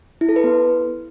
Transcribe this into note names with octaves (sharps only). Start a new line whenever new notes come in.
E4
A4
B4
B3